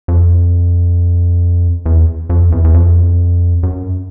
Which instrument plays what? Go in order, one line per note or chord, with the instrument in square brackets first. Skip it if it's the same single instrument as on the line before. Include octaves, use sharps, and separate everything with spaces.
[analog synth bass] F2
E2
F2
E2
E2
F2
F#2